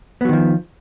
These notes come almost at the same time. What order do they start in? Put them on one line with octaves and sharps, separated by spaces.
B3 F#3 D#3 F3